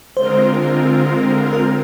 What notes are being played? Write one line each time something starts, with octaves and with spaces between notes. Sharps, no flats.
D3 G#3 C4 F4 A#4 C5
C4 A#4